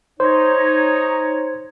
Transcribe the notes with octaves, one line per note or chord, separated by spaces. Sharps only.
D#4 C5 C#5